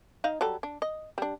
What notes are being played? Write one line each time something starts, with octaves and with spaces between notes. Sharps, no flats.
D#4 D#5 F5
F#3 G3 A4
D4
D#5
G3 D4